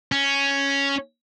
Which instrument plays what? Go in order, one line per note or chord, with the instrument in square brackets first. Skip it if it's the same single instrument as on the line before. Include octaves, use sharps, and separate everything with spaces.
[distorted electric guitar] C#4